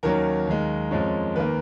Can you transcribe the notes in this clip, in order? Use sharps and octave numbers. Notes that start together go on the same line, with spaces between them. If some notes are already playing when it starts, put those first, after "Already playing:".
D#2 D#3 F#3 C#4 A#4
D#2 D#3 G#3
F2 F3 G#3 C#4
D#2 D#3 A#3 B4